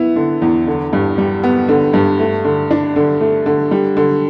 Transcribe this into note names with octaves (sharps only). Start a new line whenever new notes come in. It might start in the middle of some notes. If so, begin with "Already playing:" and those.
Already playing: B3 E4
D3
E2
D3
G2
G3
B3
D3
G2
A3
D3
D4
D3
A3
D3
G3
D3